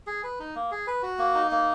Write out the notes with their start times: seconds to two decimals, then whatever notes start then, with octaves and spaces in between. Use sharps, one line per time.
0.07 G#4
0.24 B4
0.39 D#4
0.56 A#3
0.71 G#4
0.87 B4
1.03 F#4
1.19 A#3
1.35 D#4
1.51 A#3